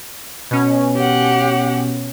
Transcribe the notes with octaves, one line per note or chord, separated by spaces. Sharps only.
B2 C#4
G4 F#5